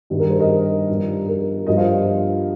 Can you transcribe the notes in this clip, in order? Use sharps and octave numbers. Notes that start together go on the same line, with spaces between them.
G2 D#3 G3
A#4
C5
A#4 D#5
G2 F3
A#4
G2 F3 A#4 D#5
C5 F5